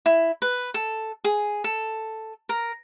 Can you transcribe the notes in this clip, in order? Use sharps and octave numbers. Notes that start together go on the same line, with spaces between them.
E4
B4
A4
G#4
A4
A#4